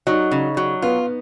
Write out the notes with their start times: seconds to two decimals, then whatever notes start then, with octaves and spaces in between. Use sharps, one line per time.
0.07 F#3 D#4
0.31 C#3
0.57 F#3
0.82 B3 F4